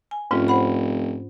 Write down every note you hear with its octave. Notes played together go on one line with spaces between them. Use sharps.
G#5
F1 G#2 C#4 F4
C5 F#5 B5